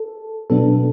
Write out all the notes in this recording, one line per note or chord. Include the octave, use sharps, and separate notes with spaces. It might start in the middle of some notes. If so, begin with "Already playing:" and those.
Already playing: A4
B2 F#3 B3 D4 A4